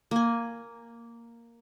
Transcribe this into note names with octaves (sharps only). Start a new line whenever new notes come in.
A#3 G#5